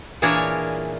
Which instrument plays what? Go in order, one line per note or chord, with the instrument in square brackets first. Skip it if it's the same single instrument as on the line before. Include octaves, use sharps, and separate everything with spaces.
[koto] A#2 E3 D4 G#4 A#4 C#5